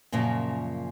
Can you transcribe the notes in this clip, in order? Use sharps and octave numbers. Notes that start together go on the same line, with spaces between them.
F#2 A#2 C#3 F3